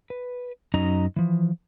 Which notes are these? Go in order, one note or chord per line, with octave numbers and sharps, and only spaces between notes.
B4
F#2 F#3 C#4 D#4 D#5 A#5
E3 F3